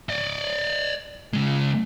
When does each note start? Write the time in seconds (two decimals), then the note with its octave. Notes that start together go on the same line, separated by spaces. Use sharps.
0.09 D5 D#5
1.34 C#3 G#3